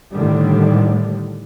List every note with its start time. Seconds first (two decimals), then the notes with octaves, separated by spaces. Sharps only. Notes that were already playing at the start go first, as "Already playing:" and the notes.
0.12 A2 D3 D#3 G3